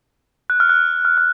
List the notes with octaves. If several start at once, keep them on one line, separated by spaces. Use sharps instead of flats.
F#6
F6
F#6
F6
F6